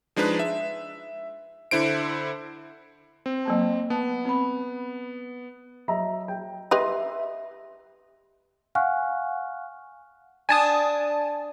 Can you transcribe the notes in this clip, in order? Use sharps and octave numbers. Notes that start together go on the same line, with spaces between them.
F3 G#3 D4 D#4 B4
E5
D3 E4 C5 D7
C4
F#3 A#3 A5
B3 A5
C4 B5
F#3 D#5 E5 A#5
G5
G4 B4 D#5 E5 C6
F5 F#5 G#5 C#6 F6 F#6
D4 G#5 A5 D#6